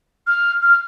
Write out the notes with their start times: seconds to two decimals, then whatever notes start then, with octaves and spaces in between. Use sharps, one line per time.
0.27 F6
0.62 F6